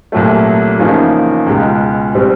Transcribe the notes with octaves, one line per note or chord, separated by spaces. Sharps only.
C2 A#2 F#3 A3
E2 C#3 F3 A#3 D#4
C#2 B2 G#3
B2 G3 C4